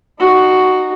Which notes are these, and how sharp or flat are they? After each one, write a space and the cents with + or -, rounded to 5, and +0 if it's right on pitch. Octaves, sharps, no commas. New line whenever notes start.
D#4 -20 F#4 +5